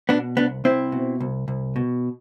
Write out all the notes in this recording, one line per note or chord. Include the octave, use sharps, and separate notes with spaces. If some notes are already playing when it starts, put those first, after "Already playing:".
B2 B3 D4
C2 B3 D4
C2 C4 E4
B2
C2
C2
B2